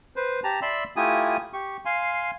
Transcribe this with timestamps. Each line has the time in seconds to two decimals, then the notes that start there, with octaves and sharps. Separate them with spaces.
0.16 B4 C5
0.44 G4 A5 A#5
0.62 D5 E5 B5 C6 E6
0.96 A3 E4 F4 G4 G#5 D#6
1.53 G4 C#6
1.85 F5 G#5 C6